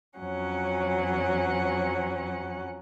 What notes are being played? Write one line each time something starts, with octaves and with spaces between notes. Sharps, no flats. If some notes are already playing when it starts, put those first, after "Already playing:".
F2 F#3 C#4 F#5